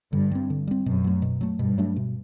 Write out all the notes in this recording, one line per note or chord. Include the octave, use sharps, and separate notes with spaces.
G2 D3
G3 C4
D3
G3 C4
F#2 B2
F#3 A3
B2
F#3 A3
G2 B2
F#3 A3 D4
B2